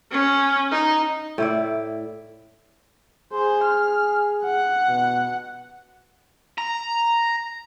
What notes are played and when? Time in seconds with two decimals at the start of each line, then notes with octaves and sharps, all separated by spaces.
0.12 C#4
0.72 D#4
1.38 A2 E4 D5
3.33 G#4 C5
3.64 F6
4.45 F#5
4.88 B2
6.58 A#5